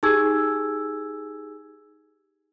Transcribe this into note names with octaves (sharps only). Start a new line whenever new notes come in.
D#4 G4 G#4 G#5 E6 G#6